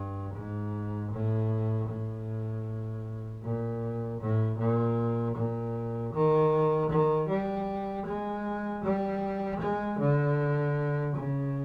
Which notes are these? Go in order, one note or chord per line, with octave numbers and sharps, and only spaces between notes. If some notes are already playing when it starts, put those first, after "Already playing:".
Already playing: G2
G#2
A2
A2
A#2
A2
A#2
A#2
D#3
D#3
G3
G#3
G3
G#3
D3
C#3